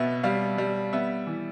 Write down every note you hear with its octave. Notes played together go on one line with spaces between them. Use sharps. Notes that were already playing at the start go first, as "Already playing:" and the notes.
Already playing: B2 B3 E5
G3 F5
G3
B3 E5
E3